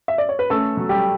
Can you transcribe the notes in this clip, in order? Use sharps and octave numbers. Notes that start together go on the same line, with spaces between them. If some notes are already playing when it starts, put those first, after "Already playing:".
E5
D5
C#5
B4
A3 C#4 A4
F#3
G3 G4